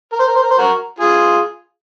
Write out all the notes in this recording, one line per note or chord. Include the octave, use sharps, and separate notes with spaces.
A#4
C5
A#4
C5
A#4
C5
F#4 A#4
F4 G#4